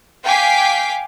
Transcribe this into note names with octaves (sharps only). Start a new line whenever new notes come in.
F5 G5 G#5 D6 B6 C7